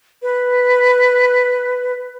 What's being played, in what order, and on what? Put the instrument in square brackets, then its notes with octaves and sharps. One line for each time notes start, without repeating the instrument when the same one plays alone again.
[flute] B4